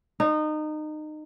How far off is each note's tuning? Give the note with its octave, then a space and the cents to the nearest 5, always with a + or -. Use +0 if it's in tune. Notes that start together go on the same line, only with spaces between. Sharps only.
D#4 -25